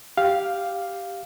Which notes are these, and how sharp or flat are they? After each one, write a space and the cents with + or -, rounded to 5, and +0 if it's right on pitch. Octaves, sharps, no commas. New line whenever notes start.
G4 +0 F5 +0